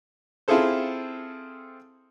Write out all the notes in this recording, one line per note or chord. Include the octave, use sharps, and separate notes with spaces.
C4 E4 F4 G#4 A4 C5